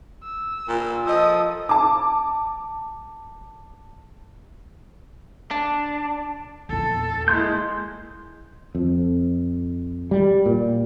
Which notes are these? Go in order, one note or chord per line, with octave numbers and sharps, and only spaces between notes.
E6
A#2
F3 A4 D#5 D#6 E6
A5 D6
D4
E2 A#2 A4
G1 G#3 A#3 E4 C6 G6
F2
G3
A#2